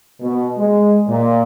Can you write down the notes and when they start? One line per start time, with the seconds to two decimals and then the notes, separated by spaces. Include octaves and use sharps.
0.21 B2
0.58 G#3
1.08 A#2